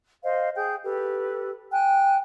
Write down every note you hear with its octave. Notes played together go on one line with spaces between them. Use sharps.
C5 D#5 F5
G#4 G5 G6
G4 A4 B4
G5 G#5 F#6